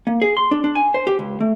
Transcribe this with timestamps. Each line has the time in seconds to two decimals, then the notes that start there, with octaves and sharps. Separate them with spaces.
0.07 A#3
0.22 G#4
0.37 C6
0.51 D4
0.64 D4
0.75 G#5
0.94 C5
1.07 G4
1.19 C#2
1.40 A3